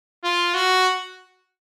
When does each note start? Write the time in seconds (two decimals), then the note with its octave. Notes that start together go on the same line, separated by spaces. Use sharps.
0.24 F4
0.54 F#4